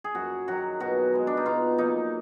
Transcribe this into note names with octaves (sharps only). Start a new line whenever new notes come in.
G#4
F#2 F#4
D#3 F#3 F#4
B2 F#4
G#3 B3
D4
D#4
B2 F4
F#3 A#3 D#4